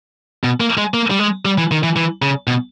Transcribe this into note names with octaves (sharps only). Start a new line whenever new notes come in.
B2
A#3
G#3
A#3
G3
G#3
G3
E3
D#3
E3
E3
C#3
B2